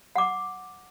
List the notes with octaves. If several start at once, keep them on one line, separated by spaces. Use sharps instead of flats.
F#5 D6